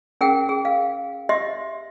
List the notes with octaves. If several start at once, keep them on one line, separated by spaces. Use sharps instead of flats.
C#4 G#4 A#4 F#5 G5
G#4
F5
G4 D#5 E5 C6